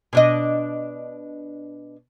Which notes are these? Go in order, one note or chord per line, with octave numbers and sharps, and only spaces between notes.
B2 D4 D#5